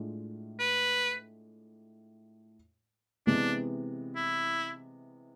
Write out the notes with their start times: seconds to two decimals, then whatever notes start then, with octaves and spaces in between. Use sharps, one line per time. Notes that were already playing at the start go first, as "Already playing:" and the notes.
Already playing: A2 G#3 D4 F4
0.59 B4
3.27 C3 E3 G#3 B3 D4
4.16 E4